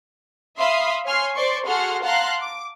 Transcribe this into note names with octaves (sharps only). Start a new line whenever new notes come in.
E5 F5 B5 C6 D#6
C#5 G#5 C6 F6 C7
C5 D5 C6 C#6
F#4 G#4 A4 F#5 C6 F6
F5 F#5 A5 A#5 C6 F#6
D6